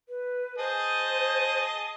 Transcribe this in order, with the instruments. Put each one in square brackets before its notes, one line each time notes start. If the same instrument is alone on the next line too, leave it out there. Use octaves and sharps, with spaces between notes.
[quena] B4
[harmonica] G#4 D#5 A5 [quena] C5